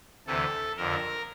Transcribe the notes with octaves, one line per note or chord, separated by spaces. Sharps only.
D2 C3 E3 A4
F2 D3 A#4